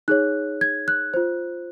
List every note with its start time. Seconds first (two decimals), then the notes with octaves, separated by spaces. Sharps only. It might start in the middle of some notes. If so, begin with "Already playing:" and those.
0.08 D#4 G#4 C#5 F#6
0.61 G#6
0.88 F#6
1.14 F4 C5